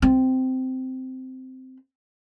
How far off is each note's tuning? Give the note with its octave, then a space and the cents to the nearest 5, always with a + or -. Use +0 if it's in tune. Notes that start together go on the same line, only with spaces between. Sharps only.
C4 -15